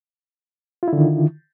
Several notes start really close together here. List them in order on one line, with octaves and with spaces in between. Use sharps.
F4 E4 D3 D#3